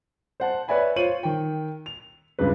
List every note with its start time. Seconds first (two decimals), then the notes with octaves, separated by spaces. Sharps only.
0.40 C5 F#5 A5
0.68 B4 C#5 D5 E5 G#5 B5
0.96 F4 C5 C#5 D#7 F#7
1.23 D#3 G5
1.86 F7
2.39 C#2 G2 F#3 G#3 B4